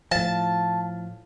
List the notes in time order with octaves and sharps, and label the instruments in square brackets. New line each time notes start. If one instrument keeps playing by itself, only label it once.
[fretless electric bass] A2 F3 [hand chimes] F5 [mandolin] A5